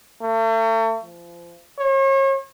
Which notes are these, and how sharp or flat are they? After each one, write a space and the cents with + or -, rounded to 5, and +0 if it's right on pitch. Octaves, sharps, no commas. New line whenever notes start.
A3 +40
F3 -30
C#5 -40